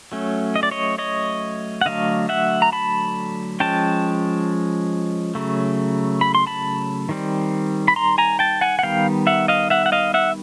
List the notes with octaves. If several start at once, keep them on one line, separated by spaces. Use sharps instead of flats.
F#3 A3 C#4
D#5
D5
C#5 D#5
C#5 D#5
F#5
D3 F#3 A3 D#5 F5
E5 F#5
A#5
A5 B5
F3 G#3 C#4 G5 A5
C#3 F#3 A3
B5
C6
A5 B5
D#3 G3 C4
B5
A#5 C6
G#5 A#5
G5 A5
F#5 G#5
F#5
D#3 G3 B3 F5 G5
E5 F#5
D#5 F5
E5 F#5
F#5
D#5 F5
E5 F#5